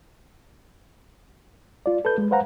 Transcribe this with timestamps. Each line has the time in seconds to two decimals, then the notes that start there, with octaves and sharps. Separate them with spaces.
1.86 F4 D5
2.05 A4 B4 G6
2.18 G#3
2.31 B4 C5 F5 F#5 A#5